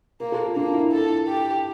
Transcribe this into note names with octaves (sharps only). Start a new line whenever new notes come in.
A#3 A#4
A4
F4
A#3 D4
E4
A4
G4